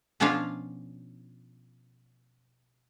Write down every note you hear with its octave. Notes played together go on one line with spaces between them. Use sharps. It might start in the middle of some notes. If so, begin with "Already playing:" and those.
B2 F3 C#4 D4 F4 F5